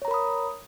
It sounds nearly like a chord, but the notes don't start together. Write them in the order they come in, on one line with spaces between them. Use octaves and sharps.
C#5 A#5 A#4 B5 D#6